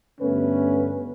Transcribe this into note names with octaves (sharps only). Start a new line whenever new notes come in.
G2 D3 A3 B3 C#4 B4